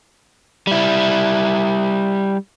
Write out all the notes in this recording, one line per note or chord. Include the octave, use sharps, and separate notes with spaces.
G3 E4